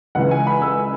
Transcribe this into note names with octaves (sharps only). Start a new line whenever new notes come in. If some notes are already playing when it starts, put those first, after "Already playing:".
C#2 C#3 E3 F#5
G#5
B5
E6